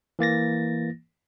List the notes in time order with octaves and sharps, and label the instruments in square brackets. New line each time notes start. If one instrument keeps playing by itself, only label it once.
[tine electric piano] E3 A#3 A6 A#6